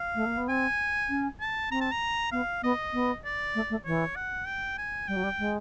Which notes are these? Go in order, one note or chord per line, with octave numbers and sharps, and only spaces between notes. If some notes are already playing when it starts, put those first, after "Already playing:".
Already playing: F5
A3
A#3
B3
C4 G#5
C#4
A5
C4 A#5
A5
A#5
B3 F5
B3 D#5
B3
D5
A3
A3
E3 C#5
F#5
G5
G#5
G3 G5
F#3
G3
G#3